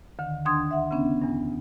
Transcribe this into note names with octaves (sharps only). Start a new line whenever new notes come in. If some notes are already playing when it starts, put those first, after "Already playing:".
D2 D3 D#3
D#2 D#3 D4 C6 D#6 G#6
E5 F#5
C#3 B3 C#4 D4
E2 G2